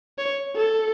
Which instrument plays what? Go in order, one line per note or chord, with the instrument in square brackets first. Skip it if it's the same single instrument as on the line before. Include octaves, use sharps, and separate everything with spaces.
[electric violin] C#5
A4